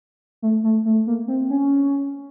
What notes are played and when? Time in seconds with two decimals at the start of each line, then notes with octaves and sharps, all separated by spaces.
0.42 A3
0.64 A3
0.85 A3
1.07 A#3
1.28 C4
1.50 C#4